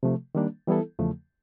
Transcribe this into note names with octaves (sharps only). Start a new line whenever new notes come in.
C3 F3 A3
D#3 G3 A#3 D4
E3 G3 B3 E4 A4
E2 C#3 F3 A3